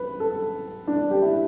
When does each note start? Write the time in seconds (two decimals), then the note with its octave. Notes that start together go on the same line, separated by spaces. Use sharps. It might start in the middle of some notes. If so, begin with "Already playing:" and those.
Already playing: B4
0.20 A4
0.88 D4
1.11 G4
1.22 E4